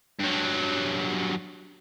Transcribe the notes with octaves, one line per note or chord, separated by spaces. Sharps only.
G2 F#3